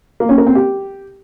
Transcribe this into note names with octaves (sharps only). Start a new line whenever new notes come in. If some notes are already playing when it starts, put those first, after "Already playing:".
A#3
C#4
A#4
C4
G4